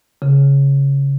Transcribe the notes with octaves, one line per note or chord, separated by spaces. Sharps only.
C#3